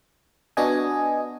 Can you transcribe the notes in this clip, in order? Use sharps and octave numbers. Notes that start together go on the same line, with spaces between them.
B3 D4 F#4 D#5 G#5